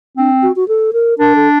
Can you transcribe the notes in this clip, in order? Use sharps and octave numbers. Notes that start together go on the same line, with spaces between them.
C4 D4
F#4
F#4
A4
A#4
D4 A#4
A4